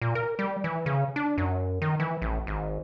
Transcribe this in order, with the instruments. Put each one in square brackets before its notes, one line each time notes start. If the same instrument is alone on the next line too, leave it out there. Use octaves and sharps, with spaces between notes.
[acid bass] A#2
A#4
G3
E3
C#3
D4
F#2
D#3
E3
A1
G#1